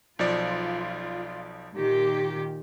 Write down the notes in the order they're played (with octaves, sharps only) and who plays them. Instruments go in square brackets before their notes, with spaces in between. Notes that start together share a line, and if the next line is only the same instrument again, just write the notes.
[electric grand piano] B1 F3 D5 [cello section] F4
[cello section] A#2 D#3 G4